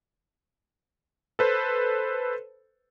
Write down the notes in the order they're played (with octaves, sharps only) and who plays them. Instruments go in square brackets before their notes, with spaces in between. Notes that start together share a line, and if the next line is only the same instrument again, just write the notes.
[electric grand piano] A4 B4 C5